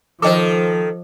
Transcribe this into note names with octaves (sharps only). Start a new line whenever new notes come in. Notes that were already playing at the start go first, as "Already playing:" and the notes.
D#3 F3 A4 C5 D#5 D6